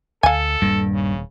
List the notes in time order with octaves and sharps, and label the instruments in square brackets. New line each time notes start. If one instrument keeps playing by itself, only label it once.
[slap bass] D2 [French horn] A4 [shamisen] F5 G#5
[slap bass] D#1 G3 A#3 [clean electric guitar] G2
[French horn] C#3